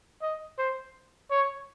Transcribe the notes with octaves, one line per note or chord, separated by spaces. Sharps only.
D#5
C5
C#5